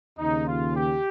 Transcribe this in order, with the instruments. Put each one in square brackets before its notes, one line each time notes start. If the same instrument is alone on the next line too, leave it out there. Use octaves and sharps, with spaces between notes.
[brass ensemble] D#2 C#3 D#4
F4
G4